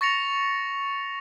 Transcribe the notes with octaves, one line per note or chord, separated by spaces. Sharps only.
C#6 A6 A#6 C#7 F7